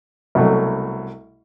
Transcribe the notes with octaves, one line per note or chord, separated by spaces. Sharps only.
C2 B2 F#3 A3